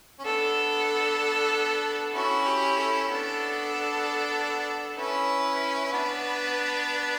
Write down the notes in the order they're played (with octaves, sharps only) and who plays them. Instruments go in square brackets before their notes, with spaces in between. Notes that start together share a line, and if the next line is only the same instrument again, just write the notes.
[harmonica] C#4
[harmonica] B3 D4 [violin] A4
[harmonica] C#4 E4 [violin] F#4
[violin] G4
A4
[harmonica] B3 D4 [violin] A4
[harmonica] C#4 E4 [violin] B4
[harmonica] E4
B3 D4